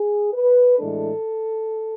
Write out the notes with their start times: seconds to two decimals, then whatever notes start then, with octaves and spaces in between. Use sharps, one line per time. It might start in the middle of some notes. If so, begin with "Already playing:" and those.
Already playing: G#4
0.33 B4
0.79 A2 E3 G#3 D4 A4